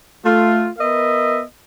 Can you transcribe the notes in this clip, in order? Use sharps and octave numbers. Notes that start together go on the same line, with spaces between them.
A3 F4
B3 A#4 D#5 E5